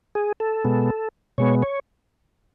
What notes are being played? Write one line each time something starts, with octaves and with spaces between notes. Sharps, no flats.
G#4
A4
B2 G#3 B3
B2 G#3 B3 C#5
C#5